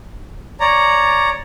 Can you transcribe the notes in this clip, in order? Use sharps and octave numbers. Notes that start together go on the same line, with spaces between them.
C#5 D5 A#5